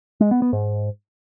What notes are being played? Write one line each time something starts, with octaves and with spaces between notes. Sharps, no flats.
G#3
B3
B3
G#2